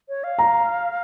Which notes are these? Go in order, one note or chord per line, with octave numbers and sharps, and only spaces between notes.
C#5
F5
A#5